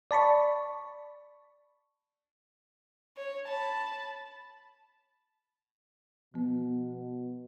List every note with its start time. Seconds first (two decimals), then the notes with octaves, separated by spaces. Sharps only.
0.11 D5 A5 B5 C#6
3.17 C#5
3.48 A5 B5
6.34 B2 F3 B3